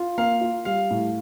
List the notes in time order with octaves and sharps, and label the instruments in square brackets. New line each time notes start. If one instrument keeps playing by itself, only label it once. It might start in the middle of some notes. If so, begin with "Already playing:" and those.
Already playing: [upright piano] F4
[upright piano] A#3 [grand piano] F5
[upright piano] F4
[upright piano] G3 [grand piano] F5
[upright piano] A2